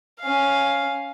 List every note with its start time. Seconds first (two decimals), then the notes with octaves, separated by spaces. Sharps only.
0.20 C#4 F5